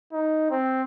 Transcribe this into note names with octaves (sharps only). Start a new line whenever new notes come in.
D#4
C4